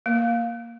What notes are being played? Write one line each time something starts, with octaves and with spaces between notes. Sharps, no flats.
A#3